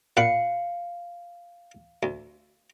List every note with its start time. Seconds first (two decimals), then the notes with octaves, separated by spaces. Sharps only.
0.17 A#2 F5 F#5 B5 C#7
2.03 D2